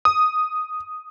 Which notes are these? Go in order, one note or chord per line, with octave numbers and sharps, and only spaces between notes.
D#6